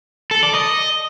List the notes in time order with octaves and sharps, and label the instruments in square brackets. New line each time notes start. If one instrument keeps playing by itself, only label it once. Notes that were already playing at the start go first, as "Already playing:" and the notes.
[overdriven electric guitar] A4
D5
D#5